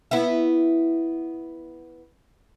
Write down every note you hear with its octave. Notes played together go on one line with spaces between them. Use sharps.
B3 E4